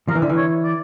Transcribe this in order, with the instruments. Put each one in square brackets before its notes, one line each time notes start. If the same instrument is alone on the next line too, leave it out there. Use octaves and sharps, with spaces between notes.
[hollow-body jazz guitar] F3 [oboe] A#4
[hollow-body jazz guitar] E3
D3
E3
[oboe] C#5
D5